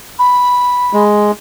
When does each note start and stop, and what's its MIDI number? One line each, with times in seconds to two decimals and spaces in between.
0.19 1.03 83
0.93 1.31 56